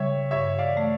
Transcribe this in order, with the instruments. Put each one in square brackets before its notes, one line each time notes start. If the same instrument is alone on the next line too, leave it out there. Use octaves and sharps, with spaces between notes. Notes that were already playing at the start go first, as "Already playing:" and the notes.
Already playing: [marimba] C#3 G3 [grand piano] C#5 E5
[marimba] G2 [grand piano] C#5 E5
[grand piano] D5 F5
[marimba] E3
A3